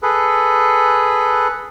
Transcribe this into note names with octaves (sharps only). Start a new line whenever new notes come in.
G#4 A4 B4